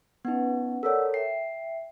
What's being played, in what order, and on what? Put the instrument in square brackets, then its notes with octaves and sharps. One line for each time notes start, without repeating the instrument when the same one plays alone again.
[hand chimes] B3 D#4 [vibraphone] C#4 B4 F#5
[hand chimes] A4 A#4 C#5 [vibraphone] D5 F#5 E6
[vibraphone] E5 G5 [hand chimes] C7